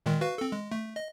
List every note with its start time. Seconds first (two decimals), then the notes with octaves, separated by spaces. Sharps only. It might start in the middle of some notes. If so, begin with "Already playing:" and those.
0.06 A#2 D#3 G#3
0.21 F#4 B4 F5
0.38 C4 A4
0.52 G#3
0.71 A3
0.96 D#5